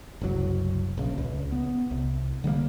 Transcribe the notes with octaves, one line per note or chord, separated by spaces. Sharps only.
F#1 C2 B2 F#3
A#1 C#3
C#2
B3
C2
D3 G3 G#3 A#3